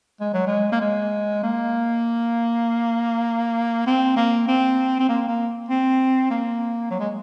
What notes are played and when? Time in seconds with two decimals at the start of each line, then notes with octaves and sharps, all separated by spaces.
0.21 G#3
0.34 F#3
0.47 G#3
0.72 A#3
0.81 G#3
1.43 A#3
3.87 C4
4.17 A#3
4.48 C4
4.99 C4
5.09 A#3
5.29 A#3
5.69 C4
6.31 A#3
6.91 F#3
7.00 G#3